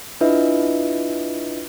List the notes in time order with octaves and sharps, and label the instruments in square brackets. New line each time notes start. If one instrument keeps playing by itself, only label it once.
[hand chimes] D4 E4 F4 B4 D#5 E5